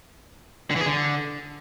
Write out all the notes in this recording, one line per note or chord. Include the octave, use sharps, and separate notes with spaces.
D3
E3
G#4
D3